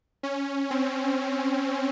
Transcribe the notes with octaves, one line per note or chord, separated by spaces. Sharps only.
C#4
C4